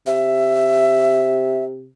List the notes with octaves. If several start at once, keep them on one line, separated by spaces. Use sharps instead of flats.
C3 E5